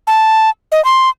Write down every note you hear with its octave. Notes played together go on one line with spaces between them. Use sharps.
A5
D#5
C6